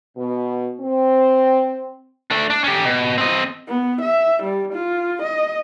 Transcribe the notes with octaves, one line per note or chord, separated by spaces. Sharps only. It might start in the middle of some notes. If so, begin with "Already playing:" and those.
B2
C4
A3 D4
D4
C#4 G4
B2
C4 D#5
B3
E5
G3
F4
D#5